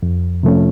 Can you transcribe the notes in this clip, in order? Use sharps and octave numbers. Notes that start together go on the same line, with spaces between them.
F2
C3 F3 A3 C#4